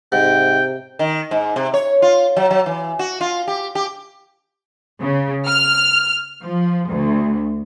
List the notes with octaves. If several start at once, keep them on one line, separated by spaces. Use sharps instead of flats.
G#2 C3 G5
D#3
G#2
C3
C#5
F4
F#3
F#3
E3
F#4
F4
G4
G4
C#3
F6
F3
D2